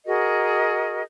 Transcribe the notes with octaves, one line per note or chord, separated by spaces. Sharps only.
F#4 G#4 A#4 D#5